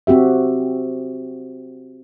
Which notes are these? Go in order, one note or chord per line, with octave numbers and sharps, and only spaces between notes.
C4 F#4 G4 E5